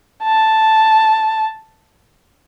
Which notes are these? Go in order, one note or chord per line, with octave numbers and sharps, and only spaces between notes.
A5